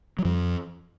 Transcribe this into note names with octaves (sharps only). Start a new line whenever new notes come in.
F#3
F2 F3